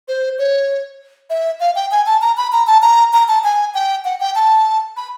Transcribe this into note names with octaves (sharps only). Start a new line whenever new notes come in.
C5
C#5
E5
F5
G5
G#5
A5
A#5
B5
A#5
A5
A#5
A#5
A5
G#5
G5
F#5
G5
A5
B5